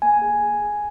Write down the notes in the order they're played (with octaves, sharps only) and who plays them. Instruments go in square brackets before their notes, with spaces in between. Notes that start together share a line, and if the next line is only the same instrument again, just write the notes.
[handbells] A#3 G#5
G#4
G#4
G#4